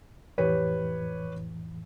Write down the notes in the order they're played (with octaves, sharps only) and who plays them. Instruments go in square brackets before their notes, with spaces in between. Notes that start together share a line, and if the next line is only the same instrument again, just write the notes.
[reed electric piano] F2 A2 E3 [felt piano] G4 B4 C#5